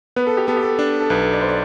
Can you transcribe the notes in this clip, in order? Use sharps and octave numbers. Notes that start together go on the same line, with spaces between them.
B3 B4
A4
G4
B3 A4
G4
A4
D4
A4
B1 B4
D5
C5
D5